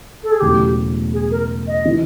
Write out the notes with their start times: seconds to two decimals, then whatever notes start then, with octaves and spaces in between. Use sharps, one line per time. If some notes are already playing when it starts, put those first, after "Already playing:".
0.23 A4
0.32 G#4
0.40 E1 E2 C#3 F#3 A3 G4
1.13 G#4
1.31 A#4
1.67 D#5
1.85 C3 E3